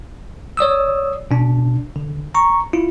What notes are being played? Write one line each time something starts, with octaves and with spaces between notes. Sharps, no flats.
C#5 D5 D#6 E6
B2 D4
D3
A#5 C#6
E4 F4